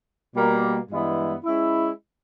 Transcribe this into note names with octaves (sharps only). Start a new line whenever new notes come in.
B2 G3 A#3
G2 E3 G#3 B3 E4
G#3 C#4 E4